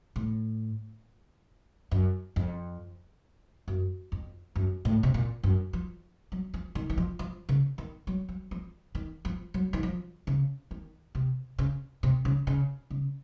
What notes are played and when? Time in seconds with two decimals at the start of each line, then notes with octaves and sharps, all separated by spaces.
0.16 A2
1.91 F#2
2.36 F2
3.68 F#2
4.12 F2
4.56 F#2
4.85 A2
5.03 C3
5.14 A#2
5.43 F#2
5.73 F3
6.32 F#3
6.54 F3
6.75 D#3
6.90 D#3
6.97 F3
7.19 F3
7.49 C#3
7.78 D#3
8.07 F#3
8.29 F#3
8.51 F3
8.95 D#3
9.25 F3
9.54 F#3
9.73 D#3
9.83 F3
10.27 C#3
10.71 D#3
11.15 C3
11.58 C#3
12.03 C3
12.25 C#3
12.47 C#3
12.91 C#3